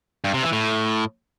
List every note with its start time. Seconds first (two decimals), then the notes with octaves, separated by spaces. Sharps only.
0.24 G2
0.34 C3
0.43 E3
0.52 A2